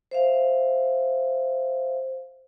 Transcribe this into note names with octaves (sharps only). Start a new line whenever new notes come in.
C5 E5 F5